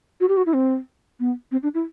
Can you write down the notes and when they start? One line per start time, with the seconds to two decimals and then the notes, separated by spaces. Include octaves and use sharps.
0.20 F#4
0.29 G4
0.37 F#4
0.46 E4
0.54 C4
1.20 B3
1.52 C4
1.63 D4
1.74 E4